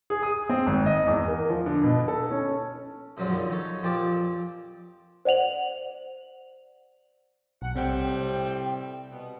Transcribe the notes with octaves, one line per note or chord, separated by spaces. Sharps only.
G#4
D#6
C4
G#1
D#5
E2
A#4
F3
D3
B2
A4
C#4
F#2 A#2 F3 F#3 G#3
F2 B2 D3 D#3
D#4 A4 C#5
F2 A#2 F3 G4 A5 D6
C5 D5 F#5 F7 F#7
B1 F#5
A2 C3 G3 C4 G5
B2 B3